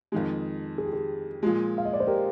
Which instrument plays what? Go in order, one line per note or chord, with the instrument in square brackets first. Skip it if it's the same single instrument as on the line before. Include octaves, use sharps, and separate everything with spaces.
[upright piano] F2 D#3 G#3
[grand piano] G#4
G4
G#4
[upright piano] A#2 F3 G#3
[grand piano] F5
D#5
D5
C5
G4 A#4